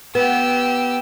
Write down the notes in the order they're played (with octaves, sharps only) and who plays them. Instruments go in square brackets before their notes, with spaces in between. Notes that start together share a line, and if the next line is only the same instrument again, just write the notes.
[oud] B3 [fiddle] G4 E6